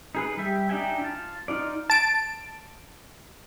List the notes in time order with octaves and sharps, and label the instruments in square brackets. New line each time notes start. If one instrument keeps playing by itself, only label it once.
[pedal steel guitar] D#4 G#4 B4
G3 G4 E5
D4 D#4 E5 G5 G#5
F4 A5
D#4 F4 D5
[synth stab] A5 D7